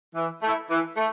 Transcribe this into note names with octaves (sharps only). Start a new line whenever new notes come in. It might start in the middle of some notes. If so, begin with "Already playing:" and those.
E3
A3 E4
E3
A3